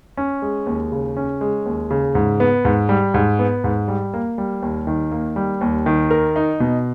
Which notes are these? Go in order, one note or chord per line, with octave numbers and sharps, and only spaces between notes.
C#4
G#3
D#2
C#3
C#4
G#3
D#2
C#3
G#2
B3
G#2
G3
G#2
B3
G#2
G3
A#3
G3
D#2
D#3
A#3
G3
D#2
D#3
A#4
D#4
B2